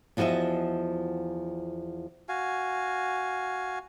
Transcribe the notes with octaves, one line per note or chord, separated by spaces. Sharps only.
E2 F3 F#4 A#4 D#5 E5
F#4 F5 G#5